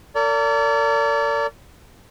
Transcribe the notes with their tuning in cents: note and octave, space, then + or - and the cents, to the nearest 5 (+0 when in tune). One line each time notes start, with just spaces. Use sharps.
A#4 -40 D5 -35